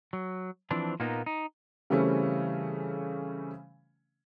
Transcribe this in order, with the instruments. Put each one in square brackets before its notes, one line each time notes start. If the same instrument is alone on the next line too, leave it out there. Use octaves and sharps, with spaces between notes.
[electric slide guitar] F#3
E3 F3 C4 D4
A#2 A#3 B3 D#4
D#4
[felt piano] C#3 E3 G3 A3 C4 C#4